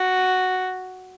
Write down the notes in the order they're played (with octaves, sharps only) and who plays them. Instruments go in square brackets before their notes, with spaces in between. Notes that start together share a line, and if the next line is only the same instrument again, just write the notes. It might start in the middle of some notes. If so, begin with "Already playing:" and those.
Already playing: [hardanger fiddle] F#4